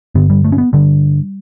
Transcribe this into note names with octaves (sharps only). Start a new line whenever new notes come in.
G2 D3 B3
G3
A3
C#4
B3
G2 D3 G3